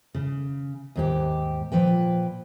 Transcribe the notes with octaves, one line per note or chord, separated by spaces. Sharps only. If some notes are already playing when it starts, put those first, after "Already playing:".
C#3
D#2 G#2 G4
A#2 F3 B4 G5